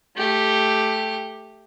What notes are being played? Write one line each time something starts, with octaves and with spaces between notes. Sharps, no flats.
A3 G4